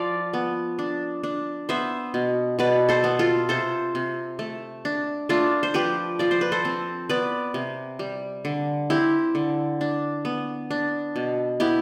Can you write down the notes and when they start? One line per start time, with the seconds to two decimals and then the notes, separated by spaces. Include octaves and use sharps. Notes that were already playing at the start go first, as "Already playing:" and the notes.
Already playing: F3 D5 F5
0.33 B3
0.79 D4
1.23 D4
1.69 B3 C5 E5
2.14 B2
2.59 B2 B4 D5
2.89 A4 C5
3.04 B3
3.19 F4 A4
3.49 C3 A4 C5
3.95 C3
4.39 A3
4.85 D4
5.29 A3 D4 F4
5.63 C5
5.74 F3 G4 B4
6.19 F3 D5
6.31 C5
6.41 B4
6.52 A4 C5
6.65 C4
7.09 B3 B4 D5
7.54 C3
7.99 G3
8.45 D3
8.90 C4 E4 G4
9.35 D3
9.81 D4
10.25 B3
10.71 D4
11.16 B2
11.60 B3 E4 G4